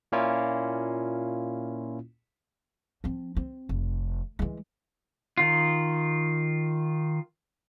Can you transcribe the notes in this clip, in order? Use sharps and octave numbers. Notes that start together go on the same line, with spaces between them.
A#2 A#3 C#4 E4 F4
F3 C4
C4
F1
E3 G#3
D#3 F4